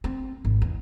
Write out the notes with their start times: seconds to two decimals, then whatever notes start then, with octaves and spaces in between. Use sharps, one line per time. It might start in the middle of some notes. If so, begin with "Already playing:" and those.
0.04 C4
0.45 G#1
0.62 E2